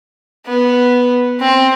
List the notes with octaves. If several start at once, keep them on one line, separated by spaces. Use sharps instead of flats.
B3
C4